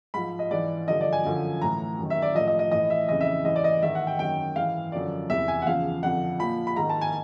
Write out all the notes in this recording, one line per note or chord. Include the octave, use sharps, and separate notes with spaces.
G#2 F3 B5
D#5
G#2 E3 D5
G2 D3 F3 D#5
D5
G#5
F#2 D3 F3
A2 E3 A#5
F#2 D#3
E5
D5
A2 F3 D#5
D#5
D#5
A2 E3 D#5
E5
F2 C#3 E3 D#5
E5
D#5
G#2 E3 D#5
D5
D#5
G#2 D#3 E5
F#5
G5
F#2 D#3 G5
G#2 E3 F5
F#2 D3 F3 D5
E2 C3 E3 E5
G#5
F#5
E2 C#3 F3 F5
F2 D3 F3 F#5
A#2 F3 B5
B5
G#2 D#3 A#5
A5
G#5